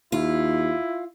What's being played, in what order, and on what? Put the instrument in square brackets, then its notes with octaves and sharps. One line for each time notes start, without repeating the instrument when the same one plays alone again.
[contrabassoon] D#2 [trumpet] E4 [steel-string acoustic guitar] F4